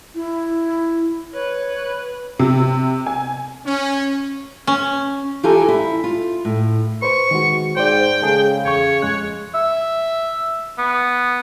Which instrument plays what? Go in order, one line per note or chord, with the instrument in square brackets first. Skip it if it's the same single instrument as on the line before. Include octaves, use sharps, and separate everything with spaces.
[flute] E4
[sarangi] B4 [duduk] C#5
[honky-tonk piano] C3
G#5
[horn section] C#4
[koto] C#4
[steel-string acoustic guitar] E3 F4 G4 A4 A#4 G#5
E4
F4
A2
[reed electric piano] B4 C5 [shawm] C#6
[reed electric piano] D#3 G#3 F#4
[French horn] G#2 [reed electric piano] C5 D5 [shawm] G5
[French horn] C#3 [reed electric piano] G#3 G#4 A4
[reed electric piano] E2 C#6 [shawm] C#5
[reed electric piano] F2 G#3 F#6
[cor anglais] E5
B3